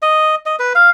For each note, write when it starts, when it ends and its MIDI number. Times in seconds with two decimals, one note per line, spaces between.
0.02 0.35 75
0.46 0.56 75
0.59 0.73 71
0.75 0.90 77